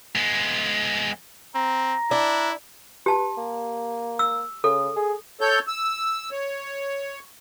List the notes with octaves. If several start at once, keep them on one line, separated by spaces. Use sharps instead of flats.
G#3 B3
C4 A#5
D4 E4
G4 B4 A5
A#3
E6
C#3 A4
G#4
A4 C#5 G6
E6
C#5